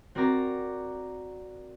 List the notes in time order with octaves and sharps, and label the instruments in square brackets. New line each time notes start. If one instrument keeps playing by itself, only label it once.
[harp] C4 F#4 A#4 D5 A#5